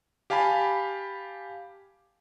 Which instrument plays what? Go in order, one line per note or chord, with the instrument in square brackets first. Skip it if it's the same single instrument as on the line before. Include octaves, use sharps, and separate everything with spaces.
[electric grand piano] G4 F5 G#5 A5 B5